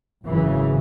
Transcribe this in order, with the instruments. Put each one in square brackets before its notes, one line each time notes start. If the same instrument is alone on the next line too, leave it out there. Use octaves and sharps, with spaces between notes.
[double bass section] G#1 F#2 C#3 E3